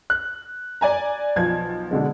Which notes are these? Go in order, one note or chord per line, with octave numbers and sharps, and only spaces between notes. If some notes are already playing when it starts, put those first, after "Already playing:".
F#6
D5 G#5 A#5
B1 F3 G#6
B2 D3 G#3